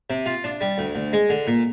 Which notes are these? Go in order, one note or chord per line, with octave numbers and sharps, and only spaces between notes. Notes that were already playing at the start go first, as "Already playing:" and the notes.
C3
F4
D4
G3
D2
D2
G#3
D3
A#2